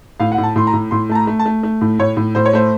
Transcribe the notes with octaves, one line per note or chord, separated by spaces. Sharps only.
A2 F5
F#5
A2
A5
A2 C6
A#5
A2
A2 C6
A3 A5
A#5
A3
A5
A3
A3
A2
A2 C#5
A2
A2 C5
C#5
A3 C5